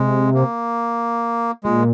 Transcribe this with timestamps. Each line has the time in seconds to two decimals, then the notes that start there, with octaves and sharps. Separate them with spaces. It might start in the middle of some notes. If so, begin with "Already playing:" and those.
Already playing: C3 G#3
0.34 A#3
1.64 A#2 G#3